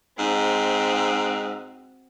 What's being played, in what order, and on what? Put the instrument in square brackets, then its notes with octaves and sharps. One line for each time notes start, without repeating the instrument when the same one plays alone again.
[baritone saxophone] G#2 [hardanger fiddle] C4 F#4